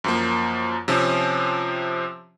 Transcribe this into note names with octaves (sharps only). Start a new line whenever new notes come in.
F#2 F3 A#3
C3 F3 C4 C#4